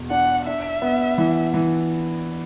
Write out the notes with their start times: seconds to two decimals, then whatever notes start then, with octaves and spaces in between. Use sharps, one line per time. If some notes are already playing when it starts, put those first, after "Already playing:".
Already playing: E2 B2
0.10 D4 F#5
0.47 D4 E5
0.82 B3
1.18 E3
1.54 E3